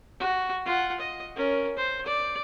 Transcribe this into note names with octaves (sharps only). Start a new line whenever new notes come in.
F#4
F4 F#5
D#5
C#4 A#4
C5
D5